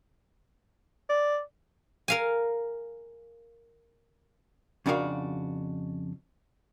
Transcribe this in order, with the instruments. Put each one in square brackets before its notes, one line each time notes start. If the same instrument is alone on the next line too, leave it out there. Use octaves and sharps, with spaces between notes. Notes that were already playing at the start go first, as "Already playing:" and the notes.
[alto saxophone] D5
[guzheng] A#4 F5 G#5
[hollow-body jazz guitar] F2 C#3 D4 F#4 A#4 F5